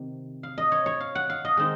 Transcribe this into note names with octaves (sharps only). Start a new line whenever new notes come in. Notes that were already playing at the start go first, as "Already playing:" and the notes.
Already playing: C3 D#3
F5
D#5
C#5
C#5
F5
F#5
F5
D#5
D#3 G#3 C4